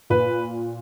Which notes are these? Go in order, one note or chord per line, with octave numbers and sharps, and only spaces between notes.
A#2 B4